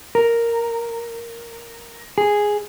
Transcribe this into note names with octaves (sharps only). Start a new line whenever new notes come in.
A#4
G#4